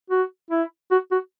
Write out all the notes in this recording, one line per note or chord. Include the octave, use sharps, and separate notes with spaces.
F#4
E4
F#4
F#4